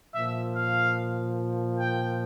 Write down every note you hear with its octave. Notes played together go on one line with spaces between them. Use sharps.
A#2 F3 E5
F5
G5